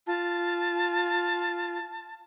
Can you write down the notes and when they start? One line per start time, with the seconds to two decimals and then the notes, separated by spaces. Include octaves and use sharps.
0.07 F4 A5